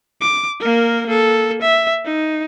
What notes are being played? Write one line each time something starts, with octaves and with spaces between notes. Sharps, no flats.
D6
A#3 A#4
A#3 A4
E5
D#4